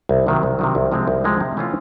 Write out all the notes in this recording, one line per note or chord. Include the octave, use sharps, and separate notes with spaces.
C2
C3 D#3 F#3
C2
C3 D#3 F#3
C2
C3 F3 G#3 C4
C2
C3 F3 G#3 C4
C3
E3 A3 C#4 F4